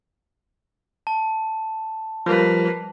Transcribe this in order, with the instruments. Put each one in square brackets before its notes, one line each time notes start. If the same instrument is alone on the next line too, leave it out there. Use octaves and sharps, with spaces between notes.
[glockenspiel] A5
[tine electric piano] F3 G3 [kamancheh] A#3 B4